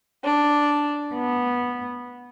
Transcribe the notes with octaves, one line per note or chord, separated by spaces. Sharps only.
D4
B3